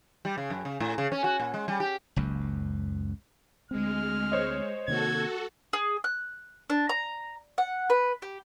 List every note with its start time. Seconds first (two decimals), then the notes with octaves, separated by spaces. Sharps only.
0.25 G3
0.38 C#3
0.50 F#2
0.65 C#3
0.80 A2
0.98 C#3
1.12 C#4
1.24 F#4
1.40 A#2
1.54 G#3
1.68 G3
1.80 G4
2.16 F#1 C#2 F#2
3.71 D2 G#3 C4 F6
4.32 C5 C#5 D#5
4.88 C3 D#3 A#3 F#4 A4 G#6
5.73 G#4
6.04 F#6
6.70 D4
6.89 A#5
7.58 F#5
7.90 B4
8.22 G4